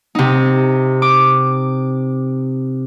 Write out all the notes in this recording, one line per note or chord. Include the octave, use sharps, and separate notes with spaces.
C3 D#4
D6